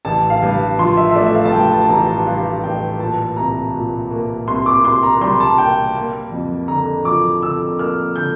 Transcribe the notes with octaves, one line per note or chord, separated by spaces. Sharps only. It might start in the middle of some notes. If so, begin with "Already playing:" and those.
A1 A5
F5
G2
F3 C6
E5
E5
A3 D5
E5
F5
A5
G2 G5
A5
A5
A1 A#5
A5
G2 F5
A1 G5
A#2 A5
C2 A#5
A#2
A#3
C2 C6
D6
C2 C6
A#5
G3 C6
A5
A#3 G5
A#3
F2
D3 A#5
F3 D6
D3 E6
A#3 F6
D3 G6